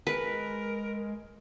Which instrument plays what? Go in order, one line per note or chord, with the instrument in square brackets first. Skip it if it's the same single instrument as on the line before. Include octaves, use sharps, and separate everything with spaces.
[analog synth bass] G#3 [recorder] A#4 [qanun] B4